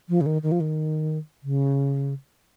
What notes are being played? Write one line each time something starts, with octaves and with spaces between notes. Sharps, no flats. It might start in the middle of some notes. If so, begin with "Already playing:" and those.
F3
C#3
D#3
D#3
F3
D#3
C#3